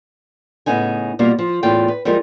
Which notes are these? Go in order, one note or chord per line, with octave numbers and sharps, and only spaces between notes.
A2 C#3 B3 D#4 G#5
B2 G3 A#3 F4 A#4
F3
E2 A2 F4 G5
B4
F3 G3 G#3 D#4 A#4